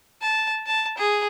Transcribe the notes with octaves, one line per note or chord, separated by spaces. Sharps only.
A5
A5
G#4